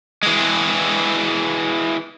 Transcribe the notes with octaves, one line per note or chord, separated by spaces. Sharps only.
E3 G#3